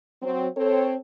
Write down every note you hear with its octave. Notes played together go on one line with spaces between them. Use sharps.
F#3 C4
C4 A4 C#5